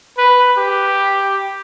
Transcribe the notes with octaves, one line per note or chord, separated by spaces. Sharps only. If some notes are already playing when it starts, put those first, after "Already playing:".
B4
G4